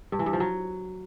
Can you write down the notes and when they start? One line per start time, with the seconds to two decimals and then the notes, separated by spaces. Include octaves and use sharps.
0.12 G2
0.19 E3
0.26 G2
0.33 F3
0.40 F#3